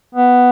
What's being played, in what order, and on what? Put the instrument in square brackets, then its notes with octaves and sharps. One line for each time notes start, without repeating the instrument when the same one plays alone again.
[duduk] B3